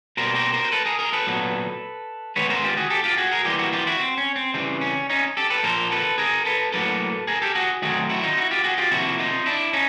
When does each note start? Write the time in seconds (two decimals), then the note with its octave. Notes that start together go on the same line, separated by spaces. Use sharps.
0.17 B2 G3 A#3 A#4 C5
0.35 A#4 C5
0.53 A#4 C5
0.65 C5
0.72 A4 B4
0.86 G#4 A#4
0.99 G#4 A#4
1.13 A4 B4
1.27 A#2 F#3 B3
2.36 D#3 G#3 B3 B4 C#5
2.50 A#4 C5
2.63 F4 G4
2.77 F#4 G#4
2.90 G4 A4
3.04 F4 G4
3.17 F#4 G#4
3.31 G#4 A#4
3.45 E3 G3 A#3 F4 G4
3.59 E4 F#4
3.73 F4 G4
3.87 E4 F#4
4.00 C4
4.18 C#4
4.36 C4
4.54 C#3 E3 G3 C4
4.81 C#4
5.10 C#4 D#4
5.37 G4 A4
5.50 A4 B4
5.63 A#2 F3 A#3 A#4 C5
5.91 A4 B4
6.18 G#4 A#4
6.45 A4 B4
6.72 A2 F#3 A#3 A4 B4
7.27 G#4 A#4
7.42 G4 A4
7.55 F#4 G#4
7.82 D#3 F#3 A3 C4 F#4 G#4
8.09 E4 F#4
8.23 D#4 F4
8.37 E4 F#4
8.51 F4 G4
8.64 F#4 G#4
8.78 F4 G4
8.91 C3 F3 A#3 E4 F#4
9.19 D#4 F4
9.46 D4 E4
9.73 C#4 D#4